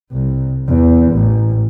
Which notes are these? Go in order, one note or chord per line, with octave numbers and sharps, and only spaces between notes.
C2
E2
A1